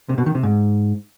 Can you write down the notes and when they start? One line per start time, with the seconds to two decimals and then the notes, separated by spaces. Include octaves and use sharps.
0.09 C3
0.18 B2
0.26 D#3
0.35 C3
0.43 G#2